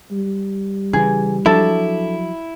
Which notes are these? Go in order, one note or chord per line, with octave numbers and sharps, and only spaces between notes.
G3
C#3 E3 G#4
F3 F#3 D4 E4 A4